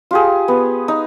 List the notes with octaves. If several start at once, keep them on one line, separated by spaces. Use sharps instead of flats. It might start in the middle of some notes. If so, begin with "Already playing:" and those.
F4 G4 G#4
B3
D#4